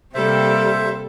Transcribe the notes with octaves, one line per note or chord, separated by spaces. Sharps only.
C3 G3 A#3 A4 C5 E5